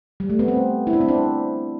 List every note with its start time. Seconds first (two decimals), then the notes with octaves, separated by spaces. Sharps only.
0.20 G3
0.30 A3
0.39 B3
0.48 C4
0.87 E4
0.93 D4
1.01 C4
1.09 D4